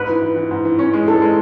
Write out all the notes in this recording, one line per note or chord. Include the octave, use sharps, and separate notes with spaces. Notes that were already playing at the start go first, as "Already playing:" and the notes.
Already playing: G#2 B4
E3
E3
E3
G#2
E3
C#4
G#3
E3 A4
G#3